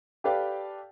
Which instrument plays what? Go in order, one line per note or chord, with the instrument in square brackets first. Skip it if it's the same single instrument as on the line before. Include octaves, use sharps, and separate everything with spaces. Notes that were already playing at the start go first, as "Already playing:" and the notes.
[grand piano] G4 A4 B4 D5 F5 G5